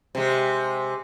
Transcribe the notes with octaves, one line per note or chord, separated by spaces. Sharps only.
C3 G#3